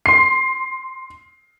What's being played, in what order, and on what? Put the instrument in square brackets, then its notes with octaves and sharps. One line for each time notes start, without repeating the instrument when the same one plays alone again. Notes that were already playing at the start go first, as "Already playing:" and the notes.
[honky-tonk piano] C6 C7